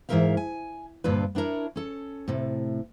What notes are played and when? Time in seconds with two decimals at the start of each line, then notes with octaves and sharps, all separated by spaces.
0.09 G#2 E3 A3 A#4 E5 F5
0.37 G#5
1.04 D2 G2 A#2 D4 F4 B4
1.35 B3 D4 E4 A#4 C#5
1.76 C#4 A4
2.28 A2 C3